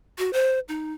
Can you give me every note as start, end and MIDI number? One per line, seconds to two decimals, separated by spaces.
0.18 0.31 66
0.33 0.59 72
0.68 0.93 63